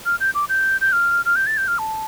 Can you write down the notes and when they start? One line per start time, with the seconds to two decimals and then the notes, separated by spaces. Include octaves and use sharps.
0.06 F6
0.20 G6
0.35 D6
0.49 G6
0.81 G6
0.92 F6
1.26 F6
1.36 G6
1.47 A6
1.57 G6
1.68 F6
1.79 A5